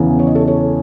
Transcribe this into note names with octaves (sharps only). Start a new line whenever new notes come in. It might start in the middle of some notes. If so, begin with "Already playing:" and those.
Already playing: E2 C#3 E3
C#5
D#5
A4 C#5
A4 C#5